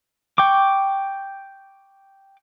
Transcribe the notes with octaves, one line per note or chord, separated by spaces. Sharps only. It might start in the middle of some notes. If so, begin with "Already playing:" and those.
G5 C#6 D6